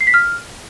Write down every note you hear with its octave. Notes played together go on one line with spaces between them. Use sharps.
C7
B6
F6